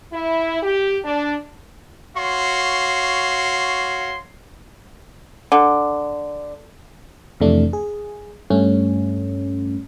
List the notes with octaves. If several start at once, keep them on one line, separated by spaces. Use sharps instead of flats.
E4
G4
D4
F#4 C#5 F5 C6
D3
F2 C3 E3 A3 D4
G#4
G2 G3 A3 C#4